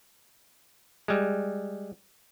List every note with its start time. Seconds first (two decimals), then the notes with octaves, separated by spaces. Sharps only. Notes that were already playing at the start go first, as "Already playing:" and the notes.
1.08 G3 G#3